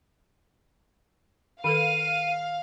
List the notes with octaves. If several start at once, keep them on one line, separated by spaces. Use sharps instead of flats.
D#3 A4 B4 F5 D#7